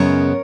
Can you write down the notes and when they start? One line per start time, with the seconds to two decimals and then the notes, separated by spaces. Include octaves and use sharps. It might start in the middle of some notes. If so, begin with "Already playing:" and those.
Already playing: F#2 C#3 G#3 B3 A#4 C#5